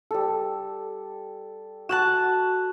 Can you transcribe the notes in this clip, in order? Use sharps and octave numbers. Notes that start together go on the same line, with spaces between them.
G3 A4
F#4 A5 F#6 E7